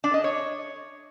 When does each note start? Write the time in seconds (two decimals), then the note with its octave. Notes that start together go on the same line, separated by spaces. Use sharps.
0.04 D4
0.14 D#5
0.24 C#5